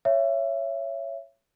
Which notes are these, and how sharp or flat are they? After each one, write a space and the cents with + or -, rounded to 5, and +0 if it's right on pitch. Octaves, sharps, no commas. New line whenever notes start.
C#5 +0 E5 +25